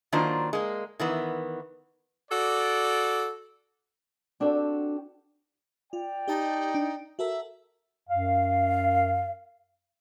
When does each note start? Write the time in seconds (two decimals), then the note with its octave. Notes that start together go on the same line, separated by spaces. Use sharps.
0.12 D#3 F#3 A#3 D4 F4 C5
0.53 G#3 A#3
1.00 D#3 E3 B3
2.30 F#4 A4 D5
4.40 C4 D4 F#4 G4 A4
5.93 F4 D5 G5
6.28 D#4 G4 D#5 A5
6.74 D4
7.19 F#4 A4 A#4 E5
8.10 F#2 F5